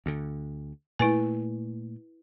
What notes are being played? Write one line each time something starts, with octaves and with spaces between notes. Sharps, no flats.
D2 D3
A#2 A3 E4 B4 G#5